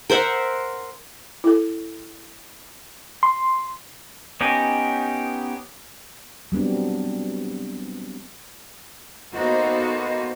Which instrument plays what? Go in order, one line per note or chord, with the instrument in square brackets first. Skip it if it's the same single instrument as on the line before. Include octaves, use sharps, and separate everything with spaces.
[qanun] A#4 C5 E5 F#5
[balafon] E4 A4
[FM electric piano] C6
[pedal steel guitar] B3 C#4 D#4 G4
[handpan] F#3 G3 B3 C4 D4
[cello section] A#3 B3 D#4 F#4 A4 C5